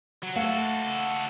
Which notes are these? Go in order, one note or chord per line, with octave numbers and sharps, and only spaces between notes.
F#3
A3 F#4 A4 F5